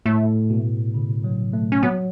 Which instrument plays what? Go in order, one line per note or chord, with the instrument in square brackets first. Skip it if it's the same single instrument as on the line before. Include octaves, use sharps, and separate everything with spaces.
[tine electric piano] A2 [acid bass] A3
[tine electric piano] B2
C#3
F#3
A3
[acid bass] C#4
[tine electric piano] F#3 [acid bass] B3